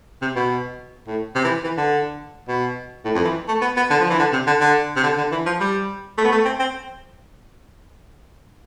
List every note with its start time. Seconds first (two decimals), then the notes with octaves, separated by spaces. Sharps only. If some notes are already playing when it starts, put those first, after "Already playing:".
0.22 C3
0.36 B2
1.07 A2
1.35 C3
1.44 E3
1.64 E3
1.77 D3
2.48 B2
3.05 A2
3.15 F2
3.24 E3
3.48 A3
3.62 B3
3.76 B3
3.90 D3
4.00 F3
4.09 E3
4.19 D3
4.32 C3
4.47 D3
4.61 D3
4.96 C3
5.03 D3
5.18 D3
5.32 E3
5.46 F3
5.60 G3
6.18 A3
6.25 B3
6.32 A3
6.45 C4
6.59 C4